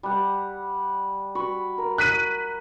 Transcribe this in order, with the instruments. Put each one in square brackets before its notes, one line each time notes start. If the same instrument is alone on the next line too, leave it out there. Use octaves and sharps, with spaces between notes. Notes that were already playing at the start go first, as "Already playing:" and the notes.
[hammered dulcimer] G3 F#5
F#4 B5 C#6
A#4
[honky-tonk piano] F#6 B6 D#7